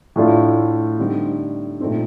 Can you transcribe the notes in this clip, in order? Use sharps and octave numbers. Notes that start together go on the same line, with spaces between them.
A2 A3 D4 F4
D3 G3 C4 D#4
A#2 A3 C4 D#4